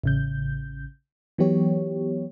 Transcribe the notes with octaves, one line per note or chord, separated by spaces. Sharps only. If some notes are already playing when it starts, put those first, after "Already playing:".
A1 C#3 G6
E3 F#3 B3 G4 C#5